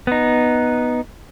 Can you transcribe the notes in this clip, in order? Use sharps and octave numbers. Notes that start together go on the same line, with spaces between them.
B3 D#4